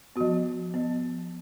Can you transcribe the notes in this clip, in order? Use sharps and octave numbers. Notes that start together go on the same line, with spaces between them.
F3 B3 F#4
F3 B3